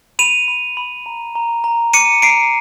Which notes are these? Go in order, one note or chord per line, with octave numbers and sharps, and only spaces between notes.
B5 D#7 F7
B5
B5
A#5
A#5
A#5
D6 C#7 D#7
A#5 C7 D7